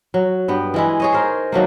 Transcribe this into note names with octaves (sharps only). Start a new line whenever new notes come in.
F#3
G2 B3 G5
E3 G#3 E4
G#4 C#5 D#5
D#4 A#4 C5
D#3 F#3 A3 A#3